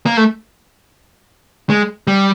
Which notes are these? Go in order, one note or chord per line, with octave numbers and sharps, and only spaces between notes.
A#3
A3
G#3
G3